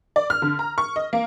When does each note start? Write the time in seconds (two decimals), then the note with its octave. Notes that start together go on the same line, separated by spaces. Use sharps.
0.16 D5
0.30 F6
0.42 D3
0.59 A#5
0.78 C#6
0.96 D#5
1.13 A#3